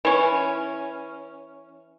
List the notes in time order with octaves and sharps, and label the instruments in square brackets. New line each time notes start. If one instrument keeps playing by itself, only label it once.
[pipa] E3 C#4